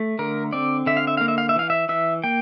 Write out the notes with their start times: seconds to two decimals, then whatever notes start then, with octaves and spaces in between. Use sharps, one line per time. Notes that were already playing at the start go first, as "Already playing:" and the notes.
Already playing: A3
0.19 D3 A#4
0.53 C4 D5
0.86 D3 E5
0.97 F5
1.07 E5
1.17 A#3 F5
1.28 E5
1.38 F5
1.49 E5
1.56 E3 F5
1.70 E5
1.89 E3 E5
2.24 A#3 G5